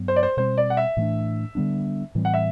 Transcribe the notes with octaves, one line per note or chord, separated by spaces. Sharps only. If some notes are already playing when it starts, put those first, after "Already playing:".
Already playing: G2 F#3 B3
C5
D5
C5
B2 G3 C4 C5
D5
F#5
E5
A2 E3 A3 D4
D3 G3 B3 D4
A2 E3 G3 C4
F#5
E5